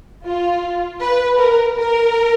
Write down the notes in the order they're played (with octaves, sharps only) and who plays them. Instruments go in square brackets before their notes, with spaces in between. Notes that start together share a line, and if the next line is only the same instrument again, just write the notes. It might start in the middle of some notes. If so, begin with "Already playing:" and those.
[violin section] F4
B4
A#4
A#4